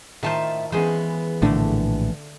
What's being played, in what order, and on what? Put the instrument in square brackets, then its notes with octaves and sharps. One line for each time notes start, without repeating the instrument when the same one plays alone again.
[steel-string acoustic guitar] A2 E5 A5 [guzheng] D#3 F4 C5
[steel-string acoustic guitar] E3 G#3 B3 [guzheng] C#4 G#4 C5
[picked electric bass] A#1 A2 D4 [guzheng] D3 A3